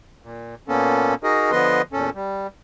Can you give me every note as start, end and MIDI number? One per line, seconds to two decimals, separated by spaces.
0.22 0.55 46
0.68 1.14 46
0.68 1.14 58
0.68 1.14 59
0.68 1.14 61
0.68 1.14 69
1.23 1.51 63
1.23 1.51 66
1.23 1.51 68
1.23 1.51 70
1.23 1.51 75
1.51 1.82 50
1.51 1.82 53
1.51 1.82 59
1.51 1.82 71
1.51 1.82 75
1.51 1.82 84
1.93 2.10 40
1.93 2.10 46
1.93 2.10 61
1.93 2.10 69
2.15 2.47 55